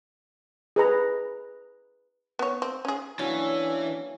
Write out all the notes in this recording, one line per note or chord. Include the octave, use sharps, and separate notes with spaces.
G#4 B4 A#5
B3 C#5
C4
C#4 G#4
E3 F#3 A#3 C#4 D4